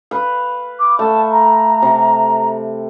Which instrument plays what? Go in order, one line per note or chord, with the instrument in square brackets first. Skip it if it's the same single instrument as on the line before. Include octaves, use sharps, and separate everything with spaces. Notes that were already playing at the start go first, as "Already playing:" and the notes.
[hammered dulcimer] B4 F5
[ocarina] D6
[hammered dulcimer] A3 [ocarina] A5
[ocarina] A#5
[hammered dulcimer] C3